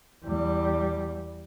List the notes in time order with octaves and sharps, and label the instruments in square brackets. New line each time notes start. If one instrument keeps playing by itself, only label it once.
[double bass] E2 G3